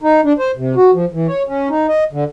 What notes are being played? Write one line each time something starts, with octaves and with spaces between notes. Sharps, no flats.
D#4
D4
C5
C3
F#4
F3
E3
C#5
C#4
D#4
D#5
D3